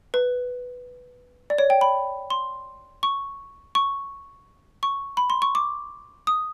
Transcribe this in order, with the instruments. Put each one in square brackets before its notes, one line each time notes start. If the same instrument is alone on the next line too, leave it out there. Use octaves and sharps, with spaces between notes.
[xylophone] B4
D5
C#5
G5
B5
C6
C#6
C#6
C#6
B5
C6
C#6
D6
D#6